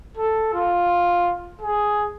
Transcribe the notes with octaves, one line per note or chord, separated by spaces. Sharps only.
A4
F4
G#4